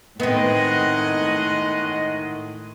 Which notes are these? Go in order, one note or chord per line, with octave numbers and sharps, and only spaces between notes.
A2 D#3 G#3 B3 C4 D#5 F#5